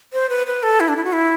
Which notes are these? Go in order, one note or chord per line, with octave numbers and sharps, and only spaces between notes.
C5
B4
B4
A4
E4
D4
E4
F#4
E4